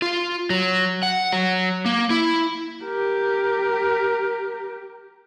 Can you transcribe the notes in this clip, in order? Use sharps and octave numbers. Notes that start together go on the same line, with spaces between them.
F4
F#3
F#5
F#3
A#3
E4
G4 A#4